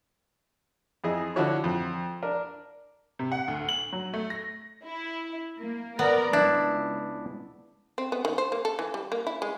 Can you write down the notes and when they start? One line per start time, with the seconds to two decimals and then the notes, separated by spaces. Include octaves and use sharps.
1.04 F2 E4 G#4 D#5
1.36 D3 F3 D4 E4 F#4 C#5
1.64 F2
2.23 D4 A#4
3.19 C3
3.32 F#5
3.48 D2
3.69 F#7
3.93 F#3
4.14 A3
4.30 A#6
4.83 E4
5.55 A#3
5.99 B3 A#4 D5
6.33 C#2 D4 E4
7.98 C4
8.12 B3
8.25 D#3
8.38 C5
8.52 A#3
8.65 A4
8.79 E3
8.94 G3
9.12 A#3
9.27 E4
9.42 G#3